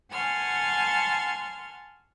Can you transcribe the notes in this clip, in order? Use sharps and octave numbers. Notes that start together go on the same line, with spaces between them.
F#5 G#5 A5 C6 C#6 F6